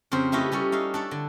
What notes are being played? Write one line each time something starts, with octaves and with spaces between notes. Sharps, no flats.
F2 C#3 C4 C5
A3 C#4 E4 G4 B4 D#5
G3 A3 C#4 A4
D#4 E5 F5
D4 A4 C#5
D3